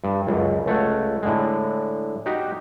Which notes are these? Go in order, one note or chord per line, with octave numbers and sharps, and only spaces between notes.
G2
C#2 F#2
C#2 A3 C#5 F#5
A2 D3 G#3
D#4 F#4 G4